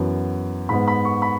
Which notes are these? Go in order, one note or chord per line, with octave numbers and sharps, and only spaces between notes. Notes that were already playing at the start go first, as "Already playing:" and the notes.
Already playing: F#2 E3 B3
G#2 G#3 B3 B5
B5
C#6
B5